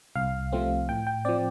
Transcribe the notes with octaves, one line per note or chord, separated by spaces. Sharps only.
C2 F5
C3 F3 A3 C4
A2 G5
G5
F3 C4 D5